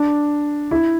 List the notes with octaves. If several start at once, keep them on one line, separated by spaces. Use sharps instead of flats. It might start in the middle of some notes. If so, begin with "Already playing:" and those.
Already playing: D4
E4